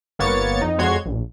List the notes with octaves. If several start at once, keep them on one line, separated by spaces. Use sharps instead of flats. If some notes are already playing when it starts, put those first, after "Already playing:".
G1 A#3 B3 C#5 A6 C#7
F2 D#4
F2 G#3 F#4 C#5 C6 G#6
A#1